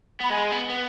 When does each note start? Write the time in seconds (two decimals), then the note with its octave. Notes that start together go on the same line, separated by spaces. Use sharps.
0.21 B3 B5
0.30 G#3 G#5
0.52 B3
0.70 B3